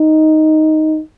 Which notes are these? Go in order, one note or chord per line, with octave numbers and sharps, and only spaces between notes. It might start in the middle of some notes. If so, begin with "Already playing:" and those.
Already playing: D#4